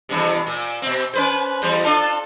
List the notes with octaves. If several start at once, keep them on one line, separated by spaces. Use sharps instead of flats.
E2 G2 C3
A#2
B2 C4
C#4 B4 C5
E2 G3 C5
D4 F4 A4